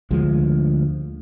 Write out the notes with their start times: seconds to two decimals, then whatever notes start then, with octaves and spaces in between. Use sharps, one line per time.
0.11 D2 F3 G#3